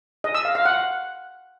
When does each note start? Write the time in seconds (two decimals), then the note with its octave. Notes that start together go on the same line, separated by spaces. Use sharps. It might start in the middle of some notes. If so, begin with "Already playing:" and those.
0.24 D#5
0.35 E6
0.45 F5
0.55 F5
0.65 F#5